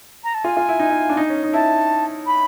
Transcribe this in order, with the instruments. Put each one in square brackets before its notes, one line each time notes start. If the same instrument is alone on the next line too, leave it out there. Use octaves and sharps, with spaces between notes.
[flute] A#5
A5
[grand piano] F4 [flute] G#5
[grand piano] F4
E4
D#4
E4
D4
D#4
C#4
D#4
[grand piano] E4 [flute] A5
[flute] B5